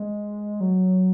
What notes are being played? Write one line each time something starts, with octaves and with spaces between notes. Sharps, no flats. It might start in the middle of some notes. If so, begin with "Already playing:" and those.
Already playing: G#3
F#3